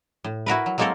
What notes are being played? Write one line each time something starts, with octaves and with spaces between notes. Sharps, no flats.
A2
E4 F#4 A#4 B4
F#3
F#3 G#3 A#3 C4 A4 A#4